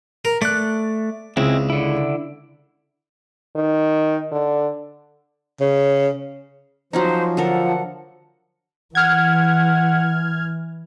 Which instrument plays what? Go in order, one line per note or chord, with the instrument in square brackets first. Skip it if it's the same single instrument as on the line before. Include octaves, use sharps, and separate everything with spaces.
[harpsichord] A#4
[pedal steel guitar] A3 F#6 [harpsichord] D5
[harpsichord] C#2 [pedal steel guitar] G#3 C4 E4
[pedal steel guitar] D3 E4
[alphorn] D#3
D3
[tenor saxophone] C#3
[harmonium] F3 [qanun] F#3 C#4 D#4 [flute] C5
[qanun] D3 A4 A#4 [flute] F#5
[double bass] E3 [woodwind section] F#5 [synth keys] F6 G#6